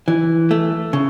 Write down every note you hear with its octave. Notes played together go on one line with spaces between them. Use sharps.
E3
A3
C#3